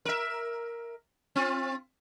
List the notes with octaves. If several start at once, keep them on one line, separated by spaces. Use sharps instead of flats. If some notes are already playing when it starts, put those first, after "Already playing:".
A#4 E5
C4 F4